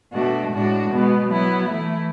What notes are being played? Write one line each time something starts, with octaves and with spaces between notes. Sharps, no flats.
B2 A3 D4 F#4
A2 G#3 D4 F#4
B2 G#3 B3
F#3 B3 E4
E3 A3 E4